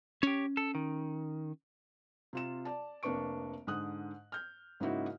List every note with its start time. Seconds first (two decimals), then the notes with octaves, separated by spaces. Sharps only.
0.23 C#4 G4 C#5
0.57 A4
0.75 D#3
2.33 C3 F4 E7
2.65 D5 A5
3.03 F1 A#3 D4 B4 C#6 D7
3.67 G#2 D3 D#6 F#6
4.32 F6 G6
4.80 G#2 C#3 A#3 D#4 E4 F#4